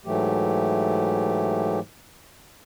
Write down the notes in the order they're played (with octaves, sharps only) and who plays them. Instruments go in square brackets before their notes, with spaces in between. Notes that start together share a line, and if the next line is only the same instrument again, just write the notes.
[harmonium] G#2 E3 F#3 A3 G4